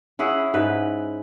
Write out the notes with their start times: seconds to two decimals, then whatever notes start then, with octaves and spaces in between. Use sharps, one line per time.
0.19 C#4 E4 G#4 F#5
0.54 G#2 B4